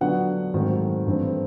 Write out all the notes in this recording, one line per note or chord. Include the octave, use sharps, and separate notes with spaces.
D3 F#3 B3 D4 F4 F#5
G#2 D#3 F#3 A3 C4
G2 E3 A3 C4